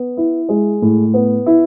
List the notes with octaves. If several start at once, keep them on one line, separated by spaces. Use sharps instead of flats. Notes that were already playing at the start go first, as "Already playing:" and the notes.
Already playing: B3
E4
G#3
A2
B3
E4